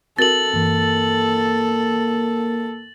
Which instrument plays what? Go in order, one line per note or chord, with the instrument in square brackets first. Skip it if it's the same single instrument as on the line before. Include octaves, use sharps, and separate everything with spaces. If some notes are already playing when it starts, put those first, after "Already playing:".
[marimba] C4 F#4 A#4 [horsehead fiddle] A4 [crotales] A6 F#7
[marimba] G2 E3 [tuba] A#3